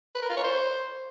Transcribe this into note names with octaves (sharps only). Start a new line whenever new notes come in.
B4
A#4
F4
C#5
C5